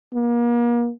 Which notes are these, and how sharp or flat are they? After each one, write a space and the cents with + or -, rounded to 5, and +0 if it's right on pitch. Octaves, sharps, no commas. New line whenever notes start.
A#3 +35